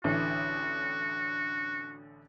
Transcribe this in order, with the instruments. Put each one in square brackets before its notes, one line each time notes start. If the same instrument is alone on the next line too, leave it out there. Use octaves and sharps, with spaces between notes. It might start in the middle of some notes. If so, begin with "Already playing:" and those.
[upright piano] A1 D3 E3 [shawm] F#4